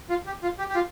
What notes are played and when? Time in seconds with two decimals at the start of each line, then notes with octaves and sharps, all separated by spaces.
0.09 F4
0.26 G4
0.43 F4
0.59 G4
0.69 G4
0.75 F4